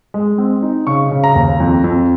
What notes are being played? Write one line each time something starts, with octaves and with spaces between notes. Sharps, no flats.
G#3
C4
D#4
C#3 C#6
C#3
A#5
D#2
F2
F2